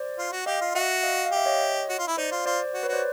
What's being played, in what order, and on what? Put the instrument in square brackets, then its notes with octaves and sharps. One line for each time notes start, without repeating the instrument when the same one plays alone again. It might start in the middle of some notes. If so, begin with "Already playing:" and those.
Already playing: [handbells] C5 D5
[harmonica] F4
F#4
[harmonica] G4 [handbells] D#5 F5
[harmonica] F4
[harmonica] F#4 [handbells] E5 F#5
[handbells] D#5 F5
F5
[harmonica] G4 [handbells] E5
[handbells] C#5 D#5
[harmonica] F#4
F4
E4
[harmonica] D#4 [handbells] C5 D5
[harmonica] F4
[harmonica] F4 [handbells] C5 D5
[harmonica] F#4
[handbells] B4 C#5
[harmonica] F#4 [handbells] C5 D5